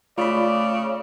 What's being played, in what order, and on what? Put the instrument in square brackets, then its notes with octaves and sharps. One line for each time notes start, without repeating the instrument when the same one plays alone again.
[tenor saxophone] C#3 [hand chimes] A3 [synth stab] F4 B5 [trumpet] D5